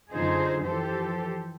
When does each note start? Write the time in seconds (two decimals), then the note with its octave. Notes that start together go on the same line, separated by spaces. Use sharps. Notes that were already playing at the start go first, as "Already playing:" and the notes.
0.11 F#2 D3 D#4 F4 G#4 C5
0.62 E3 F3 G4 A4 C5